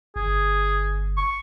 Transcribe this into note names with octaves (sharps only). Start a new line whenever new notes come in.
G1 G#4
C#6